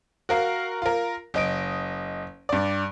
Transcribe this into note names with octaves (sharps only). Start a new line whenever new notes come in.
F#4 A#4 F5
F4 A#4
F#1 D#5 D7
G2 D5